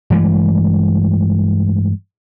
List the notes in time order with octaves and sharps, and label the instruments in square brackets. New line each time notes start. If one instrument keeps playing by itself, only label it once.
[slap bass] G2 E3 G#3 A3